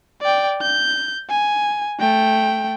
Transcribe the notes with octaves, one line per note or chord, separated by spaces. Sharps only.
D5 G5
G6
G#5
A3 G5